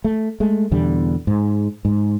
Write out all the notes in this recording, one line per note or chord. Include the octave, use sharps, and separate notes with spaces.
A3
G#3 A3
E2 B2 D3 G3
G#2
G#2